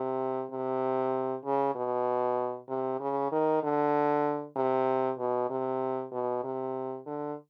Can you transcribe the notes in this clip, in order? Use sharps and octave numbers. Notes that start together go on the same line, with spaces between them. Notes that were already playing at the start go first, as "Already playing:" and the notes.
Already playing: C3
C3
C#3
B2
C3
C#3
D#3
D3
C3
B2
C3
B2
C3
D3